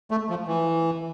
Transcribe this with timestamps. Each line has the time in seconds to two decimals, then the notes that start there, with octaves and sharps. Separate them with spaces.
0.11 A3
0.30 F3
0.47 E3